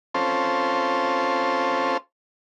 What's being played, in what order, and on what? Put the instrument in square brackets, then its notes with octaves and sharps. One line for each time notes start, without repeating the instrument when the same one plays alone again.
[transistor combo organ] C4 C#4 F4 A4 C5